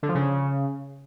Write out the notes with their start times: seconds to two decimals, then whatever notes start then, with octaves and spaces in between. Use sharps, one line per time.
0.03 D3
0.09 F3
0.15 C#3